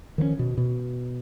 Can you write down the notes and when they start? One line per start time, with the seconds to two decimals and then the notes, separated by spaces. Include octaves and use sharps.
0.18 D#3 F3 G#3 C#4
0.39 B2
0.57 B2